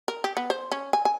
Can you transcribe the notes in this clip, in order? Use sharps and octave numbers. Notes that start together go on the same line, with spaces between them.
A#4
G4
B3
C5
C#4
G#5
G#5